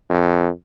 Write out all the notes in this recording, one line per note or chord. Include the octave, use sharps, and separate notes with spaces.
F2